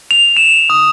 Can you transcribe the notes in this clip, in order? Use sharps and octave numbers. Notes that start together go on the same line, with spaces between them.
F7
E7
D#6